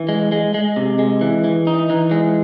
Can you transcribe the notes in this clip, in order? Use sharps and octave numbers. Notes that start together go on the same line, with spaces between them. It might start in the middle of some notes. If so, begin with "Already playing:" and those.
Already playing: E3
G#3
G#3
G#3
C3
G#3
E3
E3
D#4
E3
G#3